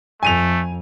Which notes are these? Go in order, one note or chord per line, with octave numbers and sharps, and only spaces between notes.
F2 A3 G#5 D#7 F7